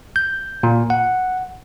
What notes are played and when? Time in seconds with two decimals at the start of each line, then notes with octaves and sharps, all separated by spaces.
0.16 G6
0.63 A#2
0.90 F#5